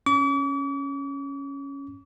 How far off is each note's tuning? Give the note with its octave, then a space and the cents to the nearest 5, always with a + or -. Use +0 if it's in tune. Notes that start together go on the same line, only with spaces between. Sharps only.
C#4 +0 D6 -45